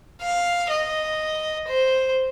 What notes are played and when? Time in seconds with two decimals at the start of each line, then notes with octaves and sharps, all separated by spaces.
0.21 F5
0.70 D#5
1.67 C5